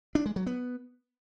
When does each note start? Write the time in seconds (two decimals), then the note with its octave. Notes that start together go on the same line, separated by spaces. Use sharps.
0.15 D4
0.26 G#3
0.36 F#3
0.46 B3